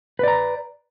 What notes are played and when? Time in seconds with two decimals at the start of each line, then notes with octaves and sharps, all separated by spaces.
0.19 B4
0.23 D5
0.28 A#5